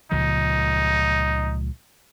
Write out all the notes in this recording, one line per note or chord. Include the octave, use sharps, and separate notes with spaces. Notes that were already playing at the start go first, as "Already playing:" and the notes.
C#2 A#2 F3 D#4